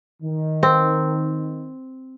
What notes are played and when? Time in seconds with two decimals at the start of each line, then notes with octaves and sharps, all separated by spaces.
0.23 D#3
0.63 C4